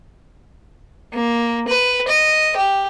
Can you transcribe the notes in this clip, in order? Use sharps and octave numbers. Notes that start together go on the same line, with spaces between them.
A#3
B4
D#5
G4